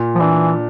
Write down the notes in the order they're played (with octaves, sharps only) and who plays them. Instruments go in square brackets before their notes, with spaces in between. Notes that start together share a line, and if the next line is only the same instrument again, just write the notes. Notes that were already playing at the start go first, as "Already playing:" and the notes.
Already playing: [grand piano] A#2
[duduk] F3
[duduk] E3 [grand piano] D4